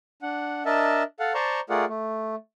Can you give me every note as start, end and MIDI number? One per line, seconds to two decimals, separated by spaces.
0.22 0.63 62
0.22 0.63 78
0.65 1.03 62
0.65 1.03 70
0.65 1.03 75
0.65 1.03 76
0.65 1.03 81
1.20 1.33 69
1.20 1.33 77
1.20 1.33 78
1.34 1.60 72
1.34 1.60 74
1.34 1.60 81
1.34 1.60 82
1.34 1.60 84
1.34 1.60 85
1.70 1.85 57
1.70 1.85 65
1.70 1.85 68
1.70 1.85 70
1.70 1.85 74
1.70 1.85 78
1.89 2.35 57